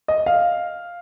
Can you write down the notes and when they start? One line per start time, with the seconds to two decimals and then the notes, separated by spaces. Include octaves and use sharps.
0.08 D#5
0.26 F5